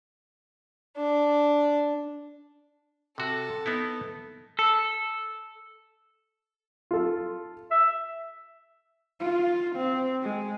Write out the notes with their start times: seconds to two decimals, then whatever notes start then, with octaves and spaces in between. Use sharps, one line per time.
0.97 D4
3.18 C3 F#4 A4
3.66 B3 D#4 E4
4.59 A4
6.91 F4 A4
7.71 E5
9.20 F4
9.76 C4
10.23 G#3